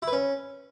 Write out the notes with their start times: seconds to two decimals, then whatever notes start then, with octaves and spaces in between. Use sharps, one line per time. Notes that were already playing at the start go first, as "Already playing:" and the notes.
0.02 E4
0.08 B4
0.13 C#4